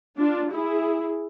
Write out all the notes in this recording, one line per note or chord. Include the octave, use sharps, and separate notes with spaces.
D4 F4
E4 G#4